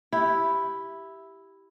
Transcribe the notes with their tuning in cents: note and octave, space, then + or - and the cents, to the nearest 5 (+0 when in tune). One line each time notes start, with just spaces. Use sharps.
E4 +0 G4 -5